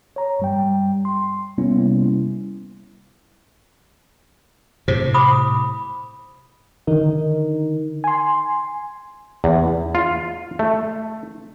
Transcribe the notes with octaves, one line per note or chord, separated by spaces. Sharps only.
C#5 A#5
G2 G3 G5
C6
C3 G3 A#3 B3 C#4 E4
A2 C3 C5
B5 D6 D#6
D3 D#3 D#4 A#4
G#5 C6
E2
F4
A3